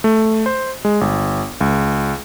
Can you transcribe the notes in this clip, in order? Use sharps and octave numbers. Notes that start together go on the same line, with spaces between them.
A3
C5
G#3
G1
C#2